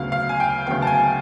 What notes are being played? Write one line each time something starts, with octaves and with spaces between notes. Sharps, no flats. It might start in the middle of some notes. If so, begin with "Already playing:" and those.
Already playing: D2 C#3 F#3 B3 F5
F5
G#5
G5
D2 C#3 F#3 B3 G5
A5
G#5